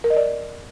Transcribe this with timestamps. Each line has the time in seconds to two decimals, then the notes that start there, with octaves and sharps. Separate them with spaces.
0.04 A#4
0.10 D#5
0.16 D5